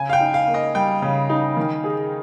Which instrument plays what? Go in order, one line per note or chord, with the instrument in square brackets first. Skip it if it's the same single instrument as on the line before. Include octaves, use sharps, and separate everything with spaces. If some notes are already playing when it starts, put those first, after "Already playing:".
Already playing: [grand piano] C#3 [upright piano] G#5
[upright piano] F5
G5
[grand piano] D#4
[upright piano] F5
[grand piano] A#3
[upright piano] D#5
[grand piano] G3 [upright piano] G5
[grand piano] C#3
D#4
D#3
G#4